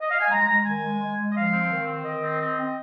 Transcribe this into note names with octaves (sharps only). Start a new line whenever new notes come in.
D#5
F5
G#5
G#3 A#5
G#3
D#3 G#5
G#3
G#3
G#3
D#5
F3 F5
C4
D#3
C4
D#3 D#5
C4
C4
C4